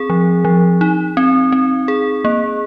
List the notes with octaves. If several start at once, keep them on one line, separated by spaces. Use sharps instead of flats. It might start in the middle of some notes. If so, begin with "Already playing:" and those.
Already playing: C4 G#4
F3
F3
D#4
C4
C4
G#4
A#3